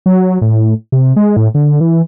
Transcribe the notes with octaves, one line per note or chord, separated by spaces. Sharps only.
F#3
A2
C3
G#3
A2
D3
E3